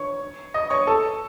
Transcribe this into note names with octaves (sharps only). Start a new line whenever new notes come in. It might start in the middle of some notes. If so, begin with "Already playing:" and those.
Already playing: C#5 C#6
D#5 D#6
C#5 C#6
A4 A5